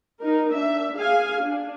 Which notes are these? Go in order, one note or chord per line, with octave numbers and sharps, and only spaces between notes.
D#4 A#4
D4 E5
G#4 F5 G#5
D4